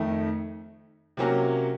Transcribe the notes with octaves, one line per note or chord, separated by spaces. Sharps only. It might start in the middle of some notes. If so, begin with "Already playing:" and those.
Already playing: F2 D#3 A3
C3 F#3 A#3 C#4 F#4